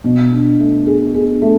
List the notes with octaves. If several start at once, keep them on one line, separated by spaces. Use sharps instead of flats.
B2
D4
A3
G#4
G#4
A3